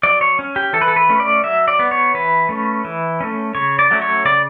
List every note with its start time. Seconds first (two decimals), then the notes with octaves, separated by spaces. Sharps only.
0.03 F#3 D5
0.21 C#5
0.39 C#4
0.56 G4
0.73 E3 A4
0.81 B4
0.88 A4
0.96 B4
1.09 A3 C#4
1.20 D5
1.44 F#3 E5
1.68 D5
1.79 B3
1.91 C#5
2.14 E3 B4
2.49 A3 C#4
2.85 E3
3.21 A3 C#4
3.55 C#3 C#5
3.79 D5
3.91 F#3 A3 C#4
4.02 C#5
4.25 C#3 D5